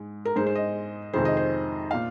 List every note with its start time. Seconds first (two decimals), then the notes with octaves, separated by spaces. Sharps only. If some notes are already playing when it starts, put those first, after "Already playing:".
Already playing: G#2 G#3
0.25 A#4
0.36 G#2 G#3 C5
0.47 C5
0.55 D#5
1.13 F2 C3 D#3 G#3 C5
1.25 D#5
1.37 C5
1.91 A#2 F5